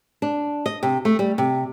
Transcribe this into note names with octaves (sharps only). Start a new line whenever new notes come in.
D4
D#5
C3
A3
G3
C3